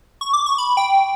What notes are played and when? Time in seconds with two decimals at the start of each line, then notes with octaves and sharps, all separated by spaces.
0.21 C#6
0.33 D6
0.46 C#6
0.58 B5
0.77 G5